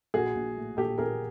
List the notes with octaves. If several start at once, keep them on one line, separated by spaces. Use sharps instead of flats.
A#1 F#4 G#4
A#1
A2
A#1 G4 A4
A#1 G#4 A#4